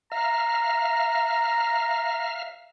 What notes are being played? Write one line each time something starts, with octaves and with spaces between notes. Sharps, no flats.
E5 F5 A#5 F6